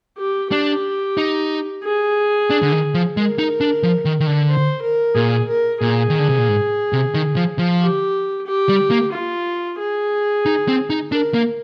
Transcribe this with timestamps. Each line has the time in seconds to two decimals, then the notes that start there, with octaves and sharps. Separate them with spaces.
0.18 G4
0.51 D4 G4
1.18 D#4
1.84 G#4
2.50 D4
2.62 D3
2.72 D#3
2.94 F3
3.17 G#3 A#4
3.39 D#4
3.61 D4
3.83 F3
4.05 D#3
4.20 D#3
4.27 D3
4.49 C5
4.82 A#4
5.15 A#2 G#4
5.48 A#4
5.81 A#2 G#4
6.10 D#3
6.19 D3
6.29 C3
6.38 A#2
6.48 G#2
6.93 C3
7.15 D#3
7.36 F3
7.59 F3
7.80 G4
8.47 G4
8.69 G3
8.91 A#3
9.13 F4
9.79 G#4
10.46 D#4
10.68 C4
10.90 D#4
11.11 D4 A#4
11.34 A#3